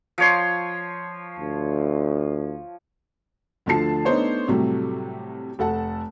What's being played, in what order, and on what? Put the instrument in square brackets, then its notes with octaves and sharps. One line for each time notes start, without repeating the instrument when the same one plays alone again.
[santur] F3 C#5 C6
[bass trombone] D2
[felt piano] D2 D3 F3 A3 A5 C7
A3 B3 D4 D#4 C5 C#5
A2 C3 F#3 G3 A3
F1 A4 F#5 A5